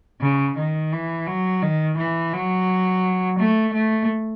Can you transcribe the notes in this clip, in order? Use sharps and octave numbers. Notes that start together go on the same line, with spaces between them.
C#3
D#3
E3
F#3
D#3
E3
F#3
A3
A3